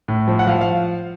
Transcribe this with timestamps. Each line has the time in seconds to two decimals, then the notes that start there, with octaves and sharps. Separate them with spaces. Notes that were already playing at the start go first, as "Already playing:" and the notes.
0.08 A2
0.28 F3
0.39 F#5
0.47 F3 F5
0.61 F5